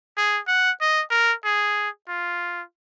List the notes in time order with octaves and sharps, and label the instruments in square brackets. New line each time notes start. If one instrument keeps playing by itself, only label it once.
[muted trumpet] G#4
F#5
D#5
A#4
G#4
F4